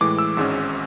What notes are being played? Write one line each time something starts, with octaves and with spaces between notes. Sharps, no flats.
A2 E3 G#3 D6
E6
G#1 G#2 G#3 C#4